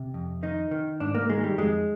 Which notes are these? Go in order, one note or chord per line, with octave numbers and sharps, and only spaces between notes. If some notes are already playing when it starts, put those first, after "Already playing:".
Already playing: C3
F2
D#3 D#4
D#3
G#2 D4
A#3
D#3 G#3
G3
F2 G#3